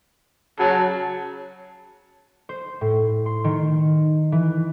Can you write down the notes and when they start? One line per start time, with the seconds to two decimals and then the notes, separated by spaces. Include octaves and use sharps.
0.59 C#3 F#3 A5
2.49 C5
2.81 A2
3.26 C6
3.44 D#3
4.32 E3